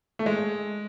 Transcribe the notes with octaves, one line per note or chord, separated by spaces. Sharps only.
A3
G#3